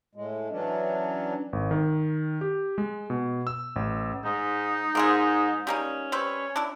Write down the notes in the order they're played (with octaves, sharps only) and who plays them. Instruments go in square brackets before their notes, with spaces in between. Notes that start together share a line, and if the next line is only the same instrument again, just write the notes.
[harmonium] A2 G#3
E3 F#3 C#4 D4
[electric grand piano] G#1
D#3
G4
G#3
B2
E6
A1
[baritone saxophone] G#2 [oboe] D#4
[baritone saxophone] G#2 [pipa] A#3 C4 G#4
[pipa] G3 A#3 D#4 [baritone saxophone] C#4
[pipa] G3 C4 B4 [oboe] C#5
[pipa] D4 E4